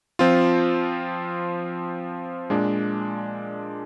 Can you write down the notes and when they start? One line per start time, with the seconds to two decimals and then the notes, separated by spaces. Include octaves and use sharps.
0.19 F3 C4 F4
2.50 A#2 G#3 D4